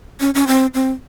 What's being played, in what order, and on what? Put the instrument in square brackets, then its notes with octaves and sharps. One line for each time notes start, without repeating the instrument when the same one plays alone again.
[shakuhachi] C#4
C#4
C4
C4